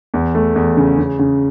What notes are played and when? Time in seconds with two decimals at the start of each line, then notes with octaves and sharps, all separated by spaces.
0.14 E2
0.35 A3
0.56 E2
0.77 C#3
0.98 C#3
1.19 C#3